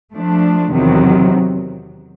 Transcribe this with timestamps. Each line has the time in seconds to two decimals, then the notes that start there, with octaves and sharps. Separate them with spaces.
0.13 F3 A3 D4
0.72 E2 C3 D#3 F#3